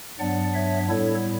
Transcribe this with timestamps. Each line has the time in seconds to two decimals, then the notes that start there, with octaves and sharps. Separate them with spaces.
0.19 G2 F#3 B3 D4 D5 F#5
0.54 C#5 E5
0.89 A2 G3 B3 E4 A4 C#5